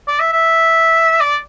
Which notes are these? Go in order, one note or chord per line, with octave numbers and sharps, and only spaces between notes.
D5
E5
E5
D5